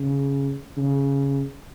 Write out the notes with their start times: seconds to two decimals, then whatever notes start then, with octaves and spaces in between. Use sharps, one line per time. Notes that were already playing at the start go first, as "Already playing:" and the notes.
Already playing: C#3
0.77 C#3